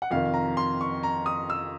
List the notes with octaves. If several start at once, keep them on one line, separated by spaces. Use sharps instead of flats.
F#5
F2 C3 D#3 F5
A#5
C6
C#6
A#5
D#6
E6